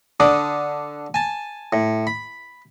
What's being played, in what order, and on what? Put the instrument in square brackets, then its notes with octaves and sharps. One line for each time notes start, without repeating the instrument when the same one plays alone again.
[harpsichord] D3 D4 D6 D#6
G#5 A5
A2
B5